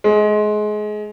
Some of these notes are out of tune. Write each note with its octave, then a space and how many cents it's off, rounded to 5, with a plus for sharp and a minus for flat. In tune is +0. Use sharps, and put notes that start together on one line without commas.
G#3 +25